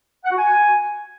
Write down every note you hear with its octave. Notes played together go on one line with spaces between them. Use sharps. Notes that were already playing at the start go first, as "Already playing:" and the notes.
F#5
F#4
G#5